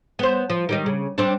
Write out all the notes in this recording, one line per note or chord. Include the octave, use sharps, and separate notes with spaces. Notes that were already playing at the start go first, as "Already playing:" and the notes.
B3 C5
F3
D#3 G3 D#4
C#3
G3 C4 D4